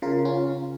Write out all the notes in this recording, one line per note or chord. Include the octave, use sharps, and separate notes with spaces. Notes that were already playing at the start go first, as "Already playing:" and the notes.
C#3 F4 A#4
C#4 F4